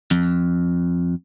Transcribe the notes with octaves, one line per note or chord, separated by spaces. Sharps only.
F2